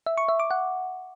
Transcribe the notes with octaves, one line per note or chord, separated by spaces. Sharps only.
E5
C#6
E5
D6
F#5